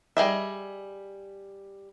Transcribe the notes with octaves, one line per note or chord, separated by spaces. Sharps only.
G3 G#4 D#5 E5